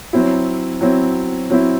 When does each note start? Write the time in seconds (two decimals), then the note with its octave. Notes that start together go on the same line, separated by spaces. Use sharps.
0.13 F#3 C4 E4
0.81 F#3 C4 E4
1.50 F#3 C4 E4